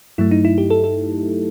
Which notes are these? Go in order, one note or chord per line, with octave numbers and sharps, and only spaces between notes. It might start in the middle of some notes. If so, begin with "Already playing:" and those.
G2 F#3 A3 E4
D#4
E4
G4
A4
A4